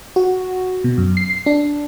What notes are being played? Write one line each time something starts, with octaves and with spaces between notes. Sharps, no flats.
F#4
B2
F#2
C7
D4